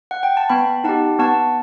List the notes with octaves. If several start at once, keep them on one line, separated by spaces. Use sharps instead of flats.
F#5
G5
A5
B3 G5 B5
D#4 G4 F#5 A5
B3 F#5 A5